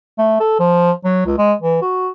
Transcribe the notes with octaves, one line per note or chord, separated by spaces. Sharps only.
A3
A4
F3
F#3
C#2
G#3
E3
F#4